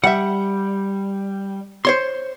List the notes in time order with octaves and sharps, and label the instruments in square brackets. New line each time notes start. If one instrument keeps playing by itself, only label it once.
[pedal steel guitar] G3 [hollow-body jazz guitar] E5 F#5
[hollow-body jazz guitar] C5 C#5 C6